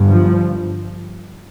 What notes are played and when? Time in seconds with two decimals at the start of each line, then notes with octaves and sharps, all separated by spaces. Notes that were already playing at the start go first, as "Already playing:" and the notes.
Already playing: G1 G2
0.08 F3